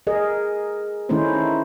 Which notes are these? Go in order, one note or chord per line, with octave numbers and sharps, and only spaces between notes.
G#4 A#4 D#5
D#3 A3 C#4 D#4 E4 C5